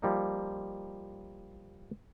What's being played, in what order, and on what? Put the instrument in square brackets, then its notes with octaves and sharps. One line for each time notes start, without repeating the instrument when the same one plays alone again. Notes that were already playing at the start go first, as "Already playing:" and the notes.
[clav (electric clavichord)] F3 G3 A#3 D#4